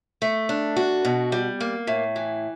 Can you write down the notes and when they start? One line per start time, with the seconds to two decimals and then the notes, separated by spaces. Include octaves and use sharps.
0.22 A3
0.49 D4
0.76 F#4
1.05 B2
1.32 G3
1.61 A#3
1.87 A2
2.16 E3